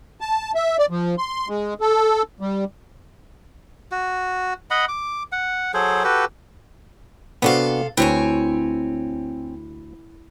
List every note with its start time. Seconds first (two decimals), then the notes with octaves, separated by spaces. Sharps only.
0.21 A5
0.55 E5
0.79 D5
0.90 F3
1.18 C6
1.48 G#3
1.81 A4
2.41 G3
3.92 F#4
4.71 D#5 F#5 B5
4.89 D6
5.32 F#5
5.74 F#3 G#4 A4 C5
6.04 F#4 G4 A4 B4
7.42 C3 B3 D4 F#4 A4 F5
7.97 D2 C4 E4 B4 C#5 G#5